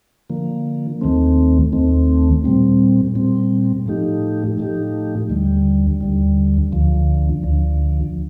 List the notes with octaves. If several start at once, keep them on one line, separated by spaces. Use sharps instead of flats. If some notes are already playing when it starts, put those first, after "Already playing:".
D3 F3 A#3
D#2 D#3 A3 C4
D#2 D#3 A3 C4
A#2 G3 C4
A#2 G3 C4
A2 F3 A3 D#4 G4
A2 F3 A3 D#4 G4
D#2 D3 G3
D#2 D3 G3
D2 D3 F3
D2 D3 F3